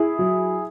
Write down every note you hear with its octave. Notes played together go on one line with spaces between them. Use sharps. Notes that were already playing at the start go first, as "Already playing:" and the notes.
Already playing: E4 G#4
F#3